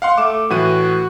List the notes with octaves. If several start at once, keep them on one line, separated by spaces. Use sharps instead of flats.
F5 F#5 C6
A3 D6 E7
A2 E3 F#4 D#7